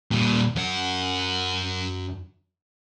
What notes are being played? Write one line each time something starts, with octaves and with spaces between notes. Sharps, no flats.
A#2 G3
F#2 F#5